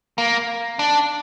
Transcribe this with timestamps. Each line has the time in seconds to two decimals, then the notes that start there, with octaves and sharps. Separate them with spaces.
0.18 A#3
0.79 D4